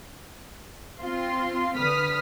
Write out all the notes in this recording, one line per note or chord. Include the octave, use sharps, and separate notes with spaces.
C4 F4 C6
D3 B4 D#6 F6 B6